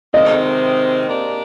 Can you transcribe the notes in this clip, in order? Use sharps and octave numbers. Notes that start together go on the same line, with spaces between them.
C3 D#3 G#3 C4 D#5
A#3 D4 G4 A#4 D5